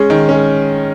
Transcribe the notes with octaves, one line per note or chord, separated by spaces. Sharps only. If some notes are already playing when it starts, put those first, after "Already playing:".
Already playing: G#3 C#4
D#3
G#3 C#4